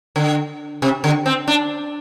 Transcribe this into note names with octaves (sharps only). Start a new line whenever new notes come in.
D3
C3
D3
C4
D4